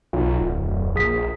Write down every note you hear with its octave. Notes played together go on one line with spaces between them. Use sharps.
B1 F4
D1
F2
A#1 G#4 D#6 B6